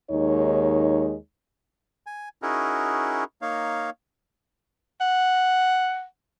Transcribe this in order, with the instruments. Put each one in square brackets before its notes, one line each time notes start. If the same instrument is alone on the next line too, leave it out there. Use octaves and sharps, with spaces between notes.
[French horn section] D#2 G#3 D#4 C#5
[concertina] G#5
C#4 D#4 E4 F#4 G#4 A#4
A#3 D#4 C#5 F5
[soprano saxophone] F#5